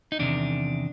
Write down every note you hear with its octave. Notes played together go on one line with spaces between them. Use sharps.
D#4
E2 C3 D#3 D4